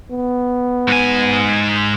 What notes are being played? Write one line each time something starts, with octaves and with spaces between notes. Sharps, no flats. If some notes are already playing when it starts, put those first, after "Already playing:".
B3
G#2 G#5